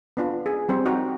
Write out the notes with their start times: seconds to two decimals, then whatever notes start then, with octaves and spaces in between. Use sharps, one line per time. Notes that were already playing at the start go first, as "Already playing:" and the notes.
0.17 B3 D4 F4
0.46 G#4
0.69 G3 C4 C5
0.85 D#4 F#4 G5